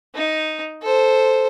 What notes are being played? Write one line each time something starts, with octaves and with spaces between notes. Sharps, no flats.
D#4
A4 C5